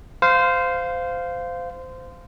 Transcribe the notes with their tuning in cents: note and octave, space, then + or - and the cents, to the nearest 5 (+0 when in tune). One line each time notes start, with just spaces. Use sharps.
C5 -20 F5 +0